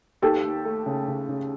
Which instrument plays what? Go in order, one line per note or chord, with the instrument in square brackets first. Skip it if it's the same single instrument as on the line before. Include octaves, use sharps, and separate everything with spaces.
[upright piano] D#2 [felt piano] G4 A4
[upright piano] D#2
A3
C#3
C#3
C#3